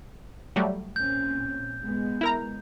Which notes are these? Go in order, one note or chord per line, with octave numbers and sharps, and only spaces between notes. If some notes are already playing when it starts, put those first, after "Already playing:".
F#3 G3 A3
A#2 C4 C#4 G6
G#3 B3
E4 A#4 A#5